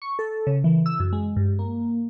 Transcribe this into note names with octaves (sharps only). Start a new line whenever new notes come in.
C#6
A4
C#3
E3
E6
F#2
G#3
G2
A#3